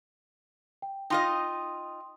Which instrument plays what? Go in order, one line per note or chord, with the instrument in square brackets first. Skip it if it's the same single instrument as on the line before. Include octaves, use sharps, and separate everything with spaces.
[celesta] G5
[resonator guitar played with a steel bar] D#4 F4 D#5 [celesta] G5 C6